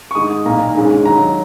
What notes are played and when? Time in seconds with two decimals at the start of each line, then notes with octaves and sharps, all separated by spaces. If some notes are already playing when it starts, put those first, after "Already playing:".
0.11 C#6
0.15 G#2 D#3 G#3 D#6
0.45 B1 A#2 A#3 A#5
0.75 A#1 G#2 D#3 G#3 C#4
1.06 D#2 D#3 F#3 A#5